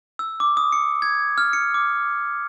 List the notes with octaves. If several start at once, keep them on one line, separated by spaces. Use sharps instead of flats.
E6
D6
D#6
C#7
G#6
F6
C#7
D6